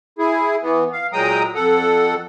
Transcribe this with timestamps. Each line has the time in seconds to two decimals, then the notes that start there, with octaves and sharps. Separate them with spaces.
0.19 E4 G#4
0.62 E3 B3
0.93 F5
1.13 A#2 F#3 G#3 G5 A#5 D#6
1.55 F2 A4 F#5